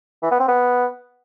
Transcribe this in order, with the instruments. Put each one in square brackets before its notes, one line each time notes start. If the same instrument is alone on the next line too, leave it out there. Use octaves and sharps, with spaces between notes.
[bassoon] E3
B3
C4
B3